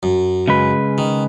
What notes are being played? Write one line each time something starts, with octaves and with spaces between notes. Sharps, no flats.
F#2
C#3 G#3 B4
D#3